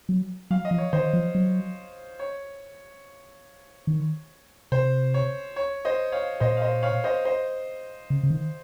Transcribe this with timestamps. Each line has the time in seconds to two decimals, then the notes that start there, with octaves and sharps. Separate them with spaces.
0.09 F#3
0.51 F#3 F5
0.65 D#5
0.71 F3
0.78 C#5
0.93 D#3 C5 D#5
1.13 F3
1.35 F#3
2.19 C#5
3.87 D#3
4.72 C3 C5
5.14 C#5
5.56 C#5
5.85 C5 D#5
6.12 C#5 F5
6.40 A#2 C5 D#5
6.57 F5
6.62 C5 D#5
6.83 C#5 F5
7.04 C5 D#5
7.25 C5 D#5
8.10 C#3
8.23 C#3
8.30 D#3